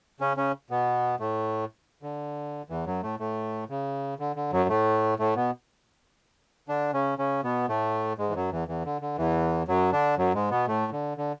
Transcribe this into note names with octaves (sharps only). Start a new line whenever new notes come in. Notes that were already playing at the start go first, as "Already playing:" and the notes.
C#3 C#4
C#3 C#4
B2 B3
A2 A3
D3
E2 E3
F#2 F#3
A2 A3
A2 A3
C#3
D3
D3
F#2 F#3
A2 A3
A2 A3
B2 B3
D3 D4
C#3 C#4
C#3 C#4
B2 B3
A2 A3
G#2 G#3
E3
F#2 F#3
E2 E3
E2 E3
D3
D3
E2 E3
F#2 F#3
D3 D4
F#2 F#3
G#2 G#3
B2 B3
A2 A3
D3
D3